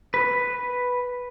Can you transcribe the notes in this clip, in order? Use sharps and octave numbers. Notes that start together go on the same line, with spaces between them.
B4